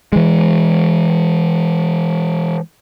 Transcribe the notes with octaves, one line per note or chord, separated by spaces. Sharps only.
E3 G#3